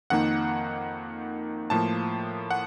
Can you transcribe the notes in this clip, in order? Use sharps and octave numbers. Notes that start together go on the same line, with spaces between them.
F2 D#3 A#3 D#4 F#5
A2 F3 A#3 A5
F#5